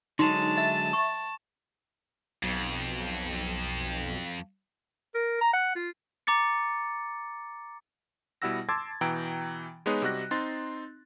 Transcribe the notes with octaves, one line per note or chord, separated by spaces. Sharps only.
D3 F#3 G#3 D#4 A5 C6
E5 A6
C#6
B1 F2
A#4
A#5
F#5
F4
A#5 D6 A6 C#7
B2 G3 E4 F#5 E6 A#6
A5 C6 D6 E6 G#6 A6
B2 E3 G5 A#5 E6 D7
G#3 B3 D#4 G#4 B4 C#5
C3 G3 F#4 D#5 F#6 A#6
C4 D#4 C6 A6